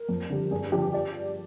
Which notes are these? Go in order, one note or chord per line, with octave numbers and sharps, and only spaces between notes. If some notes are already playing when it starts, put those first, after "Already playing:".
Already playing: A#4
F2
D3 G3
G2 G#4
D3 F3 G4
D5